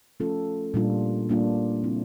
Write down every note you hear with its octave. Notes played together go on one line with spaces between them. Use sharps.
F3 A3 C#4 F4 A4
A#2 G3 A#3 D4 F4
A#2 G3 A#3 D4 F4
C#3 F3 G#3 C4 E4